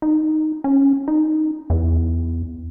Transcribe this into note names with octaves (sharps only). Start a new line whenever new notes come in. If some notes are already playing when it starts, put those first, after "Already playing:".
D#4
C#4
D#4
E2